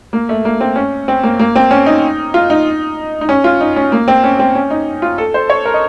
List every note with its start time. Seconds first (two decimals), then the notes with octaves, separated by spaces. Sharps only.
0.13 A#3
0.29 A3
0.45 A#3
0.61 C4
0.76 C#4
1.08 C4
1.23 A#3
1.39 A#3
1.56 C4
1.71 C#4
1.86 D#4
2.34 F4
2.50 D#4
3.21 D#4
3.29 C#4
3.44 F4
3.60 D#4
3.76 C#4
3.92 A#3
4.08 C4
4.24 C#4
4.39 C4
4.55 C#4
4.70 D#4
5.02 F4
5.18 A4
5.34 C5
5.50 C#5
5.65 A#4
5.74 D#5